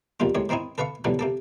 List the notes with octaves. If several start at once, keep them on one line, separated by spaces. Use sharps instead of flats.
A#1 D#2 D#3 G3 F4
D#2 A2 G#3 C#5
D#3 A#3 C4 D#4 E4
A4 B4 E5 F5 C#6
B2 D3 E3 F#3 G3 A3
C3 A#3 A4